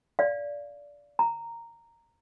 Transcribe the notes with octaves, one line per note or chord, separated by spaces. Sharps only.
D5 F5
A#5